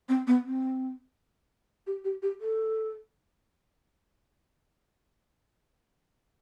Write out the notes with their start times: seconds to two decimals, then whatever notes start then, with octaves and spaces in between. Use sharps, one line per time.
0.09 C4
0.27 B3
0.45 C4
1.87 G4
2.04 G4
2.22 G4
2.40 A4